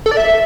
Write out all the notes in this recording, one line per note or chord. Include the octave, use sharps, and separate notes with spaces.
A4
D5
E5